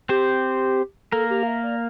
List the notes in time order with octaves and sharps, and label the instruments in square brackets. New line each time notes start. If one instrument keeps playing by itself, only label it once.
[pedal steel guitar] C4 C5 [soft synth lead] G4
[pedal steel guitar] A#3 A#4 [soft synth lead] A4
[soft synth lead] G4
F5
E5
D5